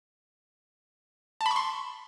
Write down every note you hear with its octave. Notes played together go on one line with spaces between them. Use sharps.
A5
B5
C#6
C6